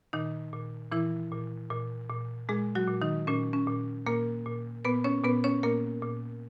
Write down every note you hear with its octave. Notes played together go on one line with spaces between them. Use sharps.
A#2 D#3 D#4
A#2
A#2 E3 E4
A#2
A#2
A#2
A#2 G#3 G#4
F#3 F#4
A#2
D#3 D#4
A#2 C#4
C#4
A#2
A#2 A#3 A#4
A#2
A#2 B3 B4
C#4 C#5
A#2 B3 B4
C#4 C#5
A#2 A#3 A#4
A#2